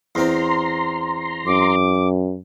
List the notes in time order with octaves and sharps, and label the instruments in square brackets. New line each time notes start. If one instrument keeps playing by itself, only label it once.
[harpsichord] E2 C4 [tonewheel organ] A#5 C6
[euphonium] F#2 [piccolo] D6